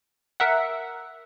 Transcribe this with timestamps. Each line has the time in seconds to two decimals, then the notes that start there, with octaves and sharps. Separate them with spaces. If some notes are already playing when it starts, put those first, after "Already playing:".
0.40 A#4 E5 F#5